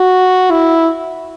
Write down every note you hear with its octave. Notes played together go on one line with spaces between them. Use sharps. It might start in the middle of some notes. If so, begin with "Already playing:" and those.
Already playing: F#4
E4